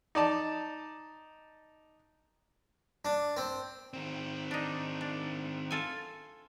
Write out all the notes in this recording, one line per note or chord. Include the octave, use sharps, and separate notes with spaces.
D#4 D5 A5
D4
C4
D#3 C4
D4 D#4
D4
F4 A4 G#5